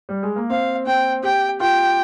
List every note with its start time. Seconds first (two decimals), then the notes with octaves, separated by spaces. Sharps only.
0.09 G3
0.23 G#3
0.36 A#3
0.50 C4 F5
0.87 C4 G5
1.23 G4 G5
1.60 F4 G5